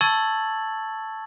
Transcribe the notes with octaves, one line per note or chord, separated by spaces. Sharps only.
A5 C#6 E6 G#6 A6 F#7